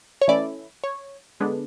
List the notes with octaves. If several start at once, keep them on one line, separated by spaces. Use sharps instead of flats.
C#5
E3 A3 C#4 E4 D5
C#5
D3 G#3 B3 D4